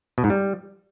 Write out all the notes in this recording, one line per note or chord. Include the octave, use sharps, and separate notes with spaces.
B2
G#2
G3